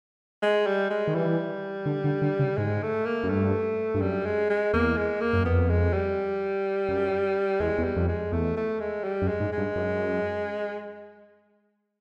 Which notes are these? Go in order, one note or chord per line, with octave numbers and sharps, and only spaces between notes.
G#3
G3
G#3
D#3
E3 G3
D3
D3
D3
C#3
G#2 G#3
A3
A#3
F#2
G2 A3
G2
F#2 G3
G#3
G#3
E2 A#3
G#3
A#3
F#2
F2 B3
G#3
G3
F#2
E2 G#3
E2
G3
F2
G#3
E2 A3
A3
G#3
G3
F#2
G#3
G#2
G#3
G2
F#2